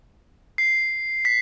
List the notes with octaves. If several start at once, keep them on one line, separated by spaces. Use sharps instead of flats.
C7
B6